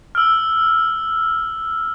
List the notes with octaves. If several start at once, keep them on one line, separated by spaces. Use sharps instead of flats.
E6 F6